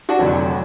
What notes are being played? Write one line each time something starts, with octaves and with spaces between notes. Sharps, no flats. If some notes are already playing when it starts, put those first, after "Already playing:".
D4 F#4
F1 F2 D3 F#3